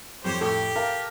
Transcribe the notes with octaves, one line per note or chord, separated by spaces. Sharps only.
F2 G3 G4 C5 C#5
A2 G4 A4
A#4 F5 A5